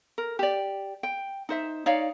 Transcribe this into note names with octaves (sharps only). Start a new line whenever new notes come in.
A#4
G4 D5
G5
D#4 C5 E5
D#4 C#5 D5 F5